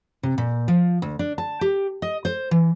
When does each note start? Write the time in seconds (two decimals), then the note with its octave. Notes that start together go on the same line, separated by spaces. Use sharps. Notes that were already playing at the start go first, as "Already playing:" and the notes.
0.23 C3
0.38 A#2
0.68 F3
1.02 D2
1.19 D4
1.38 A5
1.61 G4
2.02 D#5
2.25 C5
2.51 E3